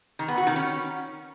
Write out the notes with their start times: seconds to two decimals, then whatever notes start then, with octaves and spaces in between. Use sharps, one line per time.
0.19 D#3
0.28 B3
0.38 F#4
0.47 D#3
0.56 C#4